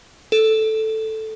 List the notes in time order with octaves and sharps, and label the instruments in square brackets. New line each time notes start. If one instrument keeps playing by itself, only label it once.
[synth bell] A4